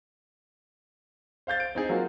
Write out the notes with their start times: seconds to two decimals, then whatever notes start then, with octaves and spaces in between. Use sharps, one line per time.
1.47 C5 F5 G6 A6
1.60 D7
1.75 C4 D#4 G#4
1.89 F#3 A#3 F4 F#4